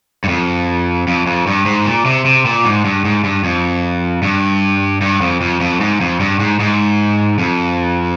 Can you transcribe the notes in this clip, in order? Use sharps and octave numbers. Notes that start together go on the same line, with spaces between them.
G2
F2
F2
F2
G2
G#2
A#2
C3
C3
A#2
G#2
G2
G#2
G2
F2
G2
G2
F2
F2
F2
G#2
F2
G2
G#2
G#2
F2